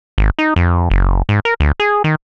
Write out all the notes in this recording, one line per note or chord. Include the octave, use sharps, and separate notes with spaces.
G#1
D#4
F2
F#1
G#2
A#4
D2
G#4
D#3